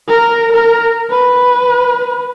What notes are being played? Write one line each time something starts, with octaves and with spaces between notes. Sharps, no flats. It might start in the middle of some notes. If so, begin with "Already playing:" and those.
A#4
A#4
B4